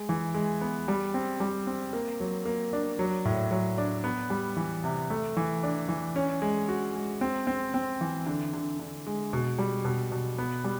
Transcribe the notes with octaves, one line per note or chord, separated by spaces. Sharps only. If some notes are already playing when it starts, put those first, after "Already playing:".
Already playing: G#3
E3
G#3
B3
G3
C4
G3
C4
A#3
F#3
A#3
D4
F#3
A2
F#3
D4
B3
G3
E3
C3
A3
E3
D4
E3
C#4
G#3
F#4
G#3
C4
C4
C4
E3
D3
D3
D3
G#3
B2
G3
B2
B2
B3
G3